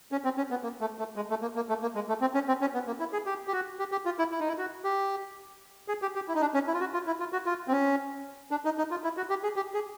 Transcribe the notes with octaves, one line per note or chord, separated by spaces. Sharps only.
C#4
C4
C#4
B3
A#3
A3
A3
G#3
A3
A#3
A#3
A3
A#3
G#3
A3
C4
C#4
C4
C#4
B3
A#3
E4
G#4
G4
G4
F#4
G4
G4
F4
E4
E4
D#4
E4
F#4
G4
G#4
G4
G4
E4
D#4
D4
C#4
E4
F4
F#4
F4
E4
F4
F#4
F4
C4
C#4
D4
D#4
D#4
F4
E4
F#4
G4
G#4
G4
G#4